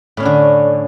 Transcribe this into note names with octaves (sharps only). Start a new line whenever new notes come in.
A2 D3 C#4 D4